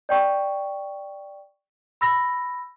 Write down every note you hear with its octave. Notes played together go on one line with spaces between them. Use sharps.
D5 G5 C#6
B5 E6 A#6